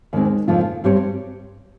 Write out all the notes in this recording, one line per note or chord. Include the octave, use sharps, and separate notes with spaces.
D#2 D#3 G#3 C4
F2 C#3 F3 A#3 F4
G2 G3 C4 G4 C#5